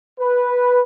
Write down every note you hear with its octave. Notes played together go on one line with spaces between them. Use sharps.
B4